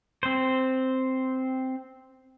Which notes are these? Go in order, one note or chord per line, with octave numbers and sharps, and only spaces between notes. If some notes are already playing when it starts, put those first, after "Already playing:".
C4 C5